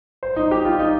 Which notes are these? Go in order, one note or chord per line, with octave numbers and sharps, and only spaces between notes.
C5
D#4
G4
F4
D#4